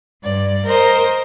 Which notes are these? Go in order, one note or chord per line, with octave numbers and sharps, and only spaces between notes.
G2 D5
A#4 C5 D#5